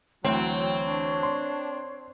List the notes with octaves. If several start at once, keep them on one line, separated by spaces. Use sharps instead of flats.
D2 E3 F#3 C4 C#5
D4
C6